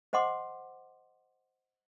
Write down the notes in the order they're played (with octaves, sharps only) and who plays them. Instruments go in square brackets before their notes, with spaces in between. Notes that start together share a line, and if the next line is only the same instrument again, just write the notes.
[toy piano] C5 D#5 F#5 C6 D6